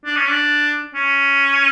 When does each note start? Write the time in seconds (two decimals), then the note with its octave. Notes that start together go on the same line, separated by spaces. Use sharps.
0.05 D4
0.16 C#4
0.28 D4
0.95 C#4